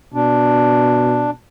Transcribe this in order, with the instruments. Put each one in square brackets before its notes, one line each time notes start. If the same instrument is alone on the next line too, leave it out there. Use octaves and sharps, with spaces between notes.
[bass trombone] B2 [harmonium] D4